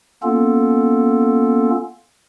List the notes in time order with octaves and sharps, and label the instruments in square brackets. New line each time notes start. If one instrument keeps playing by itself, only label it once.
[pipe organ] A#3 B3 C#4 F4 A4